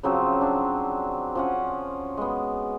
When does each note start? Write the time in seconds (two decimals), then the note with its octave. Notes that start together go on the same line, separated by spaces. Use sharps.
0.03 C#3 F3 F#3 C4
0.41 D4
1.35 F3 C#4 F#5
2.17 G#3 B3